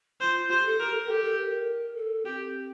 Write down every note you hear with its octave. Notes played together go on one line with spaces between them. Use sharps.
F4 C5
F4
G4 C5
A4
G4 A#4
A4
A#4
G4 A4
A4
A#4
A4
C4 G4